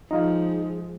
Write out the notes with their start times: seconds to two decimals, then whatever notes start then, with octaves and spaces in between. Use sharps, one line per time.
0.11 F3 G#3 D#4 F4